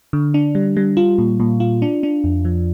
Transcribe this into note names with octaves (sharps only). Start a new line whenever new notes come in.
D3
D4
G3
G3
F4
A#2
A#2
F4
D4
D4
F2
F3